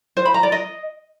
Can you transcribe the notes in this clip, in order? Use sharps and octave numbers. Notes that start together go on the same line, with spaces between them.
C5
B5
A#5
D5
D#5